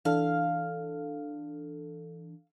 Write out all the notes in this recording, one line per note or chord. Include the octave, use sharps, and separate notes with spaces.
E3 D4 A4 F5